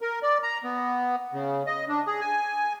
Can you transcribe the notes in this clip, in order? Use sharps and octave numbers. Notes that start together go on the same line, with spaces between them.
A#4
D5
A#5
B3
C#3
D#5
D4
G#4
G#5